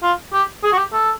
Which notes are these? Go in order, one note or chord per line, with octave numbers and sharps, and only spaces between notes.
F4
G4
G#4
F#4
G4
A4